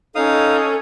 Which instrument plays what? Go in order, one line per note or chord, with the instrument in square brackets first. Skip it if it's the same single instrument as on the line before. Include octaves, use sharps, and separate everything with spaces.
[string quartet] C#4 [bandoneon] D#4 F5 D#6 [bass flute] A4